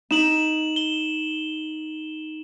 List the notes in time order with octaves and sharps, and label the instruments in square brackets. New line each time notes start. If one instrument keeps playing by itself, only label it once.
[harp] D#4 [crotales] E7 F#7
[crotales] G7